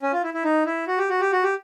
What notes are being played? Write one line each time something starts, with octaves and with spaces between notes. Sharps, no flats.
C#4
F4
E4
E4
D#4
E4
F#4
G4
F#4
G4
F#4
G4